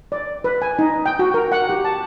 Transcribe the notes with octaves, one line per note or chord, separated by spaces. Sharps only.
D5
B4
G#5
D#4
G5
F#4
A#4
F#5
G4
A5